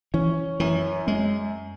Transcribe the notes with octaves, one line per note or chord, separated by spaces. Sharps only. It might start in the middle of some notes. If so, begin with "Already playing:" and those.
E3 C#4
F#2 E3
F#2 G#3